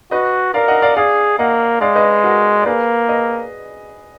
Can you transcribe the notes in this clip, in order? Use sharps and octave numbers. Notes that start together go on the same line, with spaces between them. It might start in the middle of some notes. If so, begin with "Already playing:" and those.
F#4 B4 D#5
A#4 D5 F5
D#5 F#5
D5 F5
G#4 D5 F5
A#3 D#5 F#5
G#3 D5 F5
B4 D#5
F#4 A#4
D5
A#3 G#4 B4
B4 D#5